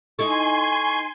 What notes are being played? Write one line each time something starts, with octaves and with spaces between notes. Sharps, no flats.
D#4 E4 A4 G#5 C6 C#6